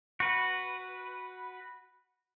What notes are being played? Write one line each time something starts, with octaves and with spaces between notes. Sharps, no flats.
F#4 B4